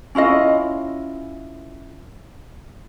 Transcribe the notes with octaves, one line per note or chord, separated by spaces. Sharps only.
C#4 E4 F4 D#5